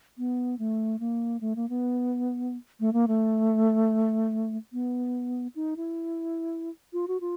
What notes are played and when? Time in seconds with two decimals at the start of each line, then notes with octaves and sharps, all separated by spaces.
0.18 B3
0.59 A3
1.00 A#3
1.41 A3
1.56 A#3
1.69 B3
2.80 A3
2.93 A#3
3.08 A3
4.73 B3
5.55 D#4
5.77 E4
6.93 F4
7.08 F#4
7.21 F4